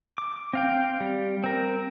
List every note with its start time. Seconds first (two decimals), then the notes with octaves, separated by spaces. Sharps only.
0.18 D6
0.53 C4 F5 G5
1.00 G3
1.44 C4 A#4